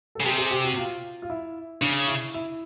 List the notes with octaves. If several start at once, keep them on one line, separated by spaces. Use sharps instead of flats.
A4
C#3
C3 G#4
G#4
G4
F#4
F4
F4
E4
C#3 D4
E4
E4